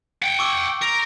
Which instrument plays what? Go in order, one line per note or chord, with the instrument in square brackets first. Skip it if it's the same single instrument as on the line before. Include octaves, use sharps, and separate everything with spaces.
[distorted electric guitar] F#5 G5
[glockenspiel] C#6 D6 E6
G6
[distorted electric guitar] A#4 [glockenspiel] D7